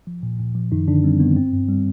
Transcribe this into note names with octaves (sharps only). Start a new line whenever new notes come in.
F3
A#2
A#2
F3
F#2 D#3 D#4
F#2 D3 D4
G3 C4
D#3 B3
G2 C4
G2
G3